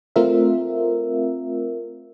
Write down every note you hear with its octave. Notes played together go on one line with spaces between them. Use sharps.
A3 C4 F4 A#4 E5